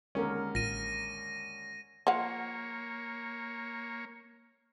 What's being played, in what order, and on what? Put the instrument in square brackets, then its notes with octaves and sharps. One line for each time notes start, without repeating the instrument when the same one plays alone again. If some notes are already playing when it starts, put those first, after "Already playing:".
[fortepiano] D#2 D3 C#4 [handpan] G#3 A#4
[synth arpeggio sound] A1 [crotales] A#6 D#7
[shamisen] F3 F#5 [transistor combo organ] A#3 C#5